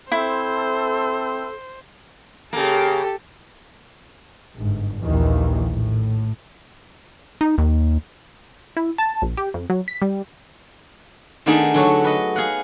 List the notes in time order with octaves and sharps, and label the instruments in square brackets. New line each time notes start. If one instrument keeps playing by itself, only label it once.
[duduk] C4 [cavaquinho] E4 [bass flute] A4 [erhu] C5
[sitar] C#3 A#3 [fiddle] G4 A4
[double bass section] G1 G#2
A#1 D#2 D#3 E3
A2
[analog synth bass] D#4
D#2
[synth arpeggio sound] E4
A5
A#1
G4
F2
F#3
B6
G3
[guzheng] D#3 A3 B3 D4 D#4 G#4
D3 F#3 C#5
B4 D#5
G#4 F5 F#5